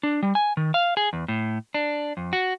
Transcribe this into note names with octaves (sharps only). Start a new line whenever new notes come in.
D4
G3
G#5
D#3
F5
G#4
E2
A2
D4
F2
F#4